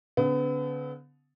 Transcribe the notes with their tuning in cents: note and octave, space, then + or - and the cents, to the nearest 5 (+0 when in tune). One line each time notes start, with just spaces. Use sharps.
D3 -35 B3 +30